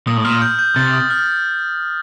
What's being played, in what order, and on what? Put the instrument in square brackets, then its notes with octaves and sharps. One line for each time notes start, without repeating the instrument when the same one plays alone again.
[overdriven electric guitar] A#2 [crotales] D#6
[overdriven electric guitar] A2
[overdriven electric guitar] A#2 [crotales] F6
[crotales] G6
G6
[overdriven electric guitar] C3 [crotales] A6
[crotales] D#6
F6